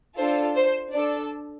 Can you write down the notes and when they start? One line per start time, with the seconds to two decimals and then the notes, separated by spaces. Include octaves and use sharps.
0.17 D4 F4 A4 C5
0.56 C5
0.93 D4 A4 D5